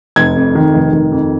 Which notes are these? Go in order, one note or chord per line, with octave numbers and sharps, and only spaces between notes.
F1 G#6
F2
D#3
F1
D#3
F2